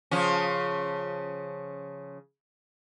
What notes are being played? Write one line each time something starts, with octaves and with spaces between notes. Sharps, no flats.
C#3 F3 C#4